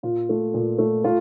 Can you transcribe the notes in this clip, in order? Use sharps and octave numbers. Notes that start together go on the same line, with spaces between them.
A#2 F4
A3
A#2
A3
A3 F4